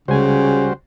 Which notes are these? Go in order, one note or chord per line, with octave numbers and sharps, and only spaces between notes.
C#2 C#3 G3 F#4 C5 G#5